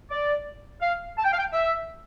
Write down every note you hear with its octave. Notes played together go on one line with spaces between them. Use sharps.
D5
F5
A5
G5
F5
G5
E5